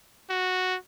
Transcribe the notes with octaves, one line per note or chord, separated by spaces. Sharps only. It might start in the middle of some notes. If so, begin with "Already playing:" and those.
F#4